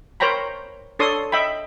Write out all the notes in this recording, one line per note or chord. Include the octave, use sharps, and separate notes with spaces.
A#4 C5 C#5 G5 A#5 B5
D4 A4 C#5 C6 D#6
D#5 E5 G5 B5